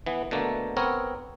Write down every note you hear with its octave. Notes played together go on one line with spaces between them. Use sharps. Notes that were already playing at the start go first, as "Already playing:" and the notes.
E3 B3
B2 D3 A3 A#3
B3 C4 A#4 C#5